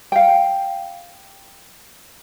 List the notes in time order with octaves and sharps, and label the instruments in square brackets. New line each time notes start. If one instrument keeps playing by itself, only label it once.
[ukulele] F5 G5